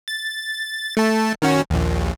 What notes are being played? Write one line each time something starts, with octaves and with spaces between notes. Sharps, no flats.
A6
A3 A5
D#3 C#4 F#4
A#1 D#2